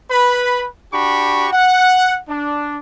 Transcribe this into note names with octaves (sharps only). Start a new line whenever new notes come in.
B4 B5
D4 F#4 G4 B5 C#6
F#5
D4